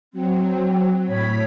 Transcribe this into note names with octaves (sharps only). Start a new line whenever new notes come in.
F#3 C4
A2 C#5 B5 B6